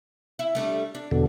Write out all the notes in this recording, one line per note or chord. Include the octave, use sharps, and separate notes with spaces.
E4
G3 A3 D4
D4
E2 B2 D3